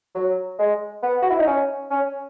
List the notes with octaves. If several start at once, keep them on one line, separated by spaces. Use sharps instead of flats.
F#3
G#3
B3
F#4
E4
D#4
C#4
C#4